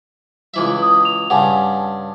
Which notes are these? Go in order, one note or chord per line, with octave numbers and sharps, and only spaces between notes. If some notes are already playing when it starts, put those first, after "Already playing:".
C#2 E3 E5
D#6
F7
G2 C#3 F#5 G#5 A5